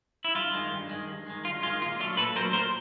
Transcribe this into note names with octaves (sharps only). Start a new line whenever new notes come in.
E4
G2 F4
D#3 G#3
G2
D#3 G#3
G2
D#3 G#3
G2 F4
D#3 G#3 F4
A#2 F4
F#3 A3 D4 F4
A#2 A4 B4
F#3 A3 D4 A#4 C5
A#2 A#4 C5